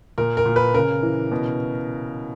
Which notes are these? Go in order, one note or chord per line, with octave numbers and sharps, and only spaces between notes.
A#2 A#4
A#4
A#2
B4
C#3 A#4
E3
B2